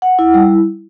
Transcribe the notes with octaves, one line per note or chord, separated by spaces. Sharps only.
F#5
E4
G3